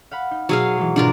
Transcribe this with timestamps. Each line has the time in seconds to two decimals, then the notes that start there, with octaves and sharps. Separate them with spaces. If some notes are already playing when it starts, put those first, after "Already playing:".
0.11 F5 F#5 B5
0.31 D#4
0.49 B2 F#3 G#4 F5 E6
0.77 E3 G#3
0.96 G#1 B2 F#3 D4 F4 A#4